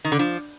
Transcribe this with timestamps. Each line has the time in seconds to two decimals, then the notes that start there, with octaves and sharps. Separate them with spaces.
0.04 D#3
0.12 D3
0.19 F3